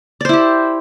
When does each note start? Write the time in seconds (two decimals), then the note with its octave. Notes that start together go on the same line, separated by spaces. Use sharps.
0.21 D5
0.25 C5
0.29 E4
0.33 G4